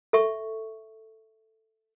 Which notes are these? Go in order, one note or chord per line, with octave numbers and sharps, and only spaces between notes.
A4 E5 C#6